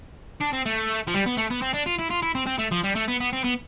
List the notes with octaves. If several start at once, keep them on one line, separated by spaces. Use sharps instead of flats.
D4
C4
A3
F3
G3
B3
A3
B3
C4
D4
F4
E4
F4
E4
C4
C4
A3
F3
G3
A3
B3
B3
C4
B3